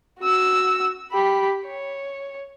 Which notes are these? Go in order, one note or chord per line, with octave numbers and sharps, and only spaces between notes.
F#4 E6
G4 B5
C#5